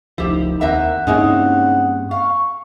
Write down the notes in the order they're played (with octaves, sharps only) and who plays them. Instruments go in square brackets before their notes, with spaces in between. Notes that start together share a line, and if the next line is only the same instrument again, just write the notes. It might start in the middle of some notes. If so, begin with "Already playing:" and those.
[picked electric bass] F1 C#2 F3 [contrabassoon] D#3 [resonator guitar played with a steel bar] E4 G4
[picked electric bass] D#2 [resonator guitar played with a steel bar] C4 A#4 E5 [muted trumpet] F#5
[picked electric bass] G2 A#3 C4 [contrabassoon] C#3 [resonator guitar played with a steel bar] G#3 D#4 E4
[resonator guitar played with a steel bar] F5 [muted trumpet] C#6